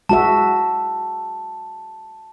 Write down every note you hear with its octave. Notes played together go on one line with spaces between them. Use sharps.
G#3 F#4 E5 A5